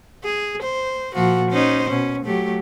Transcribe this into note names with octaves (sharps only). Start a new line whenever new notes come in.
G#4
C5
A#2 F3 F#4
C#4 D#4 C5
B2 C#4
F#3 A3 G4